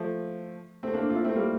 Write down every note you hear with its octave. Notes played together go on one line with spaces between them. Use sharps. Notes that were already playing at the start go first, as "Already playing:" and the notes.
Already playing: F3 A3
A3 C4
A#3 D4
F4
C4 E4
A3 C4
G3 A#3